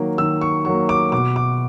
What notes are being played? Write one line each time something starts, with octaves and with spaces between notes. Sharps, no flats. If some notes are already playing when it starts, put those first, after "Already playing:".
Already playing: D#3 F#3 A#3
D#3 E6
C#6
F#3 A#3 C#6
D6
B2 D6
D6